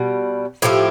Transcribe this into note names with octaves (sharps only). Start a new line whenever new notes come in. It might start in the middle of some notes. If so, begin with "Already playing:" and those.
Already playing: B2 G3
A2 F3 A3 G4